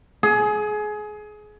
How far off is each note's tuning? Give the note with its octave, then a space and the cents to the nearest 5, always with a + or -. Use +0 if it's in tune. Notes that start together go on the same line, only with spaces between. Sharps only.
G#4 +25